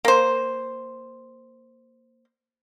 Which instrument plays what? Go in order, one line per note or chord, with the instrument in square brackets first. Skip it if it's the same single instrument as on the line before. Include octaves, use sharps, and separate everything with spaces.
[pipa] A#3 C5